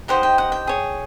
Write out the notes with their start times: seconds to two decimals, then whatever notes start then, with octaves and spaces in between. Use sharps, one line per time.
0.08 D#4 G4 C5 D#5 F#5
0.23 G5
0.38 F#5
0.52 G5
0.67 G#4 C#5